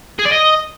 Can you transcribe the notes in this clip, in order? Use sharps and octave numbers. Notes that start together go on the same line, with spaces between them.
G#4
D5
D#5